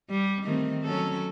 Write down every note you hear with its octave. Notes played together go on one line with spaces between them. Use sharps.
G3
D#3 A3 C4
F#3 C#4 A4